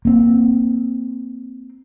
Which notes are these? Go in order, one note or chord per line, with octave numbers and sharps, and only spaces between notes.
A#3 C4